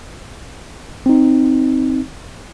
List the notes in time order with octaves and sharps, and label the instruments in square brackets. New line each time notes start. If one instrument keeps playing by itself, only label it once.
[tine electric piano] C4 D#4